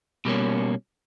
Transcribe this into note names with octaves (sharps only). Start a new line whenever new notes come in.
B2 G3 A#3 C#4